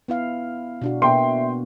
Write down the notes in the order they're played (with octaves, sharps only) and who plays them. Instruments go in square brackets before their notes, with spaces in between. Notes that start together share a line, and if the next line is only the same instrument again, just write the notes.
[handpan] B3 E4 F5
B2 D4 F#4
[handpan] B2 A#3 B3 [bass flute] E5 [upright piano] G5 C6